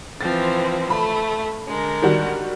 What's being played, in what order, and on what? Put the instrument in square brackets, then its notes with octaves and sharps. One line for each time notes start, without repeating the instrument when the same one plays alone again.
[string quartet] E3 F3 C4 [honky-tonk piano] A6
[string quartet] A3 [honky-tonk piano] B5
[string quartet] D3 G#3 A#4
[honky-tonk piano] D#3 G3 F#4